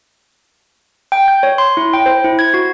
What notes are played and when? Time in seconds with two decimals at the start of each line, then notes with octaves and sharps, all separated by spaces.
1.12 G5
1.28 G6
1.43 C#5
1.58 C6
1.77 E4
1.93 G5
2.06 C5
2.24 E4
2.39 G#6
2.54 F#4